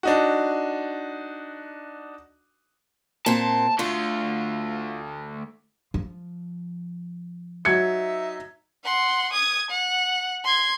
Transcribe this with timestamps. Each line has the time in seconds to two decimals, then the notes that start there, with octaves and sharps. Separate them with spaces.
0.03 D4 D#4 F#4
3.26 A#2 C4 A5
3.79 D3 A3 F4
5.94 F3
7.65 F#3 D#4 E5 G#6 C#7
8.84 F#5 C6
9.33 D#6 G#6
9.71 F#5
10.44 C6 G#6